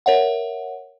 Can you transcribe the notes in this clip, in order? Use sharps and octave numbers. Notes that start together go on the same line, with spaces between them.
A#4 C#5 E5 F#5